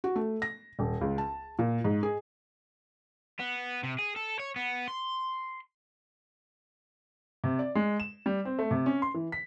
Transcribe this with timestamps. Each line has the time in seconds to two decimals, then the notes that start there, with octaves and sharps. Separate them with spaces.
0.04 F#4
0.16 A3
0.42 A#6
0.79 D#1
1.01 C#2
1.18 A5
1.59 A#2
1.84 G#2
2.03 G#4
3.40 B3
3.83 C3
3.99 G#4
4.16 A4
4.39 C#5
4.56 B3
4.88 C6
7.44 C3
7.59 D5
7.75 G#3
8.00 E7
8.26 G3
8.45 C4
8.59 A3
8.71 C3
8.86 C#4
9.02 C6
9.14 E3
9.32 B6